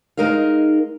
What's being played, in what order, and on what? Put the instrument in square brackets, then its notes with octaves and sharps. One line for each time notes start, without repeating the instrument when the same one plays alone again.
[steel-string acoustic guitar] G#3 D#4 A#4 D#5 F5